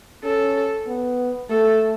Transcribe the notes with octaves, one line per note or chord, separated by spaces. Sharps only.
C#4 A4
B3
A3 A4